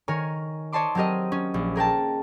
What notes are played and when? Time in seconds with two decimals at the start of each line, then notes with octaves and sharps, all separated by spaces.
0.08 D#3 A#4 C#5 G#5
0.72 C#5 D#5 A5 C6 D6
0.95 F#3 C4 G4 A#4 D#5
1.32 C#4
1.54 A#1
1.75 G#4 A#4 G5 A5